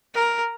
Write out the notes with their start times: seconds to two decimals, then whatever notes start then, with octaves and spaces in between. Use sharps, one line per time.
0.14 A#4